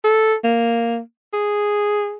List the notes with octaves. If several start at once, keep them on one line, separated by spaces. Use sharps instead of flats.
A4
A#3
G#4